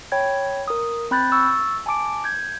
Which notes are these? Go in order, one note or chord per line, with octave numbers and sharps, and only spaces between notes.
C#5 G5 B5 G#6
A#4 D#6
C4 B5 F#6 G6 A6
C#6 E6 A6
G#5 A5 D6 D7
G6 G#6